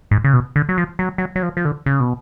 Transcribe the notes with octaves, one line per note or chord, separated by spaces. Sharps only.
G#2
C#3
B2
D3
F#3
F3
F#3
F#3
F#3
F3
F3
D3
C#3
B2